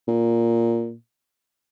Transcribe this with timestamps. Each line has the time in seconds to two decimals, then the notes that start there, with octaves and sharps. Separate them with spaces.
0.08 A#2